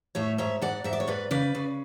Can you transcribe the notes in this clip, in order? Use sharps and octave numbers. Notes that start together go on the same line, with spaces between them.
A2 C#5 E5
G#2 C#5 E5
G#2 D5 F#5
G#2 E5
D5
C#5
G#2 B4 D5
C#3 B4 D5
C#3